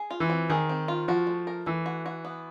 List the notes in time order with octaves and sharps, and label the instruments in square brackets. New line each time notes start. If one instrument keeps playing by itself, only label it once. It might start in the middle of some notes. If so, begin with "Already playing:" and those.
Already playing: [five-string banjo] G#4
F4
[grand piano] E3
[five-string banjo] C4
[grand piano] D#3 [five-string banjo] G#4
[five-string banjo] C4
F4
[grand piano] F3 [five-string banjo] F#4
[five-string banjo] A3
A#4
[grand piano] E3 [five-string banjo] A3
[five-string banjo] F#4
F#4
B3